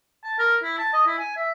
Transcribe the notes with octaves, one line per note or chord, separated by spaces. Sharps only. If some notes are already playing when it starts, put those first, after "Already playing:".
A5
A#4
E4
A5
D#5
E4
G#5
E5